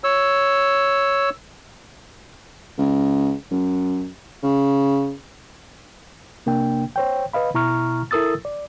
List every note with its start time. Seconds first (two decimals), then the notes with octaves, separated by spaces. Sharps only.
0.04 C#5 E6
2.78 C#2
3.51 F#2
4.43 C#3
6.46 C3 A#3 D4 G5
6.96 C5 C#5 G5
7.33 B4 D#5 F5 B5
7.54 B2 E4 A#5 C#6 F6
8.11 E4 A4 A#4 D#6 E6 A6
8.45 D5